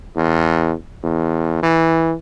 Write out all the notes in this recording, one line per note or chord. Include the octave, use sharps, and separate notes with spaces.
E2
E2
E3